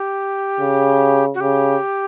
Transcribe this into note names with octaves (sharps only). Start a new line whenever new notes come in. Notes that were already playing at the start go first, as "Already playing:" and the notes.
Already playing: G4
C#3
F#4
C#3 G4